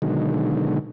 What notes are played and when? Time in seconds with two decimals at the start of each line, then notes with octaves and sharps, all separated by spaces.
0.02 B2 D3 D#3 F#3 G#3